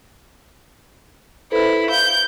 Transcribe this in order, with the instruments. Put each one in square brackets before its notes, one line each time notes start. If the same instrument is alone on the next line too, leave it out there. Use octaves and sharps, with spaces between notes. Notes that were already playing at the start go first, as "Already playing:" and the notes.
[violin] E4 [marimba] A4 B4 C5
[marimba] F5 [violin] G6